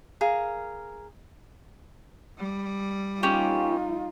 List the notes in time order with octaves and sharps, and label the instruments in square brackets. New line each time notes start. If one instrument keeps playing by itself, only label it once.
[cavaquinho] G#4 A#4 F5
[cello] G3
[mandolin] A#3 C#4 G4 [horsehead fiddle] D#4 F4